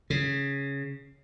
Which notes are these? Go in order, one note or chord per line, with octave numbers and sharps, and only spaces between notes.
C#3